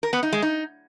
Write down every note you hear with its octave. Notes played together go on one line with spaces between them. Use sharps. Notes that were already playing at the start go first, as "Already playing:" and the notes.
A#4
B3
D#4
G#3
D#4